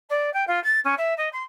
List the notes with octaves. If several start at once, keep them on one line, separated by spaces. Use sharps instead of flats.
D5
G5
F4
A6
C#4
E5
D#5
C6